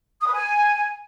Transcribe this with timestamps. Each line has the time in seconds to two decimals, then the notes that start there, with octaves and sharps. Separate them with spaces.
0.21 D#6
0.28 B4
0.34 G#5